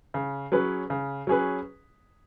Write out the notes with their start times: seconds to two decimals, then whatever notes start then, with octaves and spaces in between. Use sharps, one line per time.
0.14 C#3
0.52 F#3 C#4 G#4 B4
0.90 C#3
1.27 F#3 C#4 G#4 B4